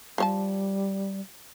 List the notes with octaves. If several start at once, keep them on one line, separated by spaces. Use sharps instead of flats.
F3 G3 C#5 A5